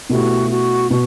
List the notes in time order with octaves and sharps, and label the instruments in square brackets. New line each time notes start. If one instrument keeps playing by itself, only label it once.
[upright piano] B2 A3 E4 G4 [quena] F#4
[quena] F#4
[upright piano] B2 [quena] F#4